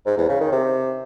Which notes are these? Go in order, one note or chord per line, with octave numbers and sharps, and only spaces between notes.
G#2
E2
C#3
D#3
C3